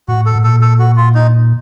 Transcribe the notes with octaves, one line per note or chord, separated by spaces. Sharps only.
A2 F#4
A4
A2
A#2 A4
A4
F#4
F4
D#4